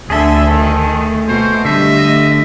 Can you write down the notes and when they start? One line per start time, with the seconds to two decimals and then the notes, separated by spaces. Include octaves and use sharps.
0.10 D2 D3 G#4 A4 E5
0.50 D#3
0.91 A3
1.28 B2 C5
1.65 D3 G3 A3 D#5 E5